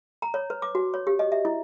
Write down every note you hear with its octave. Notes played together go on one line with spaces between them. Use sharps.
A#5
C#5
B4
D6
F#4
C#5
G4
D#5
E5
E4